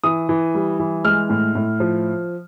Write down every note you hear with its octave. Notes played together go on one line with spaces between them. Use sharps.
E3 D#6
E3
G3
E3
G#3 F6
A2
A2
F3